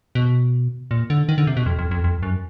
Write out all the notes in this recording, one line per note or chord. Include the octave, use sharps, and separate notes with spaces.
B2
A#2
D3
D#3
D3
C3
B2
F2
F2
F2
F2
F#2